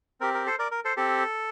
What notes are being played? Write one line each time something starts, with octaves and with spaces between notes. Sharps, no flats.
C4 G4 A#4
A#4
A4 C5
A#4 D5
A#4
A4 C5
C4 G4 A4